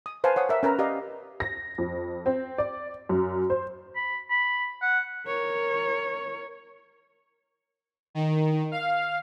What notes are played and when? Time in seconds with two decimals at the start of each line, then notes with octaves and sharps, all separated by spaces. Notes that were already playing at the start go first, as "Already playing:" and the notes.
0.06 D#6
0.24 B4 C5 F5 G#5 A5
0.36 C#5 F#5 D#6
0.49 A#4 E5
0.63 C#4 A#4 B4 A#5
0.79 G4 D5 D#5 F5
1.40 A#6
1.78 F2
2.26 C4
2.58 D5
3.09 F#2
3.50 C5
3.96 B5
4.30 B5
4.82 F#5
5.27 A#4 C#5
8.15 D#3
8.72 F5